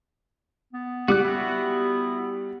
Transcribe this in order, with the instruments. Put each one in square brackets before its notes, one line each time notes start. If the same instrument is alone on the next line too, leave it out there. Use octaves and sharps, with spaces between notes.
[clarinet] B3
[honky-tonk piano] G3 [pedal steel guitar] F#4 D6 F#6
[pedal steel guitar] E4 F#4